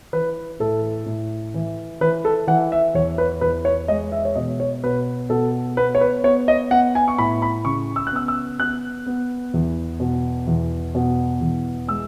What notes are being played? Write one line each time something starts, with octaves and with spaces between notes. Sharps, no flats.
E3 B4
A2 A4
A2
E3
E3 B4
A4
E3 F#5
E5
E2 C#5
B4
E2 B4
C#5
G#3 D#5
E5
C#5
B2 D#5
C#5
B2 B4
B2 A4
B3 B4
C#5
B4
B3 C#5
D#5
B3 F#5
G#5
C#6
A2 B5
B5
C#3 C#6
E6
F#6
B3 E6
E6
B3 F#6
B3
E2
B2
E2
B2
E2
G#3 E6